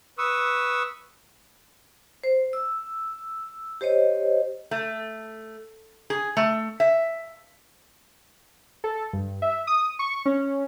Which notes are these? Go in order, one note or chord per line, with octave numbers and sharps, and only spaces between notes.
B4 C#6 D#6 E6
C5
E6
G4 C5 C#5 D#5
A3
G#4
A3
E5
A4
G2
E5
D#6
C#6
C#4